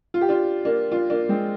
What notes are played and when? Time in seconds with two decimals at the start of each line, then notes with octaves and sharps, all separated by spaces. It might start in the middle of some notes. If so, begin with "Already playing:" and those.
0.14 F4
0.21 G4
0.29 D4 F4
0.65 A#3 D4
0.92 D4 F4
1.10 A#3 D4
1.29 G#3 C4